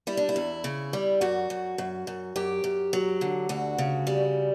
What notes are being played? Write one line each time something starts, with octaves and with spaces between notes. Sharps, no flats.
G3 E4
D4
E4
E2
C#3
G3
F#2 F#4
F#2
F#2
F#2
F#2 G4
F#2
F#3
D3
D2 F#4
C#3
G3